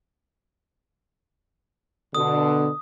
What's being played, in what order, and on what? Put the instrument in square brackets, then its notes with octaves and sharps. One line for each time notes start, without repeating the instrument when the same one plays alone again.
[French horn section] B2 D3 [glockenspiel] D#6